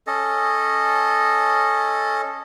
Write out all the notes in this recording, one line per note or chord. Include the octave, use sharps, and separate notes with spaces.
C#4 A4 D#5